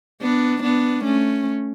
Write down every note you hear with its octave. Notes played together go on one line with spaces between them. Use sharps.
B3 D4
B3 D4
A3 C#4